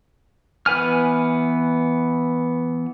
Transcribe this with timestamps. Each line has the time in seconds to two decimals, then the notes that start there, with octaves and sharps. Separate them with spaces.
0.66 E3 B3 B4 G#5 F6